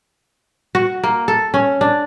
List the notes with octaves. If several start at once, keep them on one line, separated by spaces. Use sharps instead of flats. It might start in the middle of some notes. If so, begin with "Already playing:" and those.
F#4
A#3
A4
C#4
D4